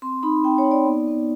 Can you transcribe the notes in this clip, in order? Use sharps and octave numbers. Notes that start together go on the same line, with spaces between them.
C4 C6
D#4 B5
C4 G5
C#5
D#4
D5
B3
B3